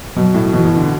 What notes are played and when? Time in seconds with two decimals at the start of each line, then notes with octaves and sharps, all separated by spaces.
0.16 B2 F#3
0.35 A2
0.52 B2 E3
0.65 B2
0.77 D3